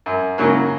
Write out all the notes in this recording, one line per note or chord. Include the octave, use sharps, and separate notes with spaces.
F#2
C#3 F#3 A#3